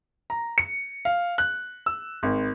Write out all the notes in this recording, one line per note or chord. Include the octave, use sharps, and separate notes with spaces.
A#5
C#7
F5
F#6
E6
G#1